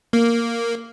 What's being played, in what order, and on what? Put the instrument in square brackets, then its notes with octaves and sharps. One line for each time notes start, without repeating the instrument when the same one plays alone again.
[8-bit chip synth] A#3